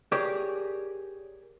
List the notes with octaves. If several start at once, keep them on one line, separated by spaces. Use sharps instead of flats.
G4 G#4 A#4 C#5 D5